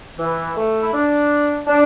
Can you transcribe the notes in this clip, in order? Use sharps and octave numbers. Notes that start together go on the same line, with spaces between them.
E3
A3
E4
D4
D4